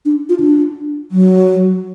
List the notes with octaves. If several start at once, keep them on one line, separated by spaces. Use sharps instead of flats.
D4
F4
D4
F#3